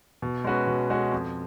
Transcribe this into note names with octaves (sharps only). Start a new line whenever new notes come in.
B2
G#3 C#4 F#4 B4
B2
G#3 C#4 F#4 B4
F2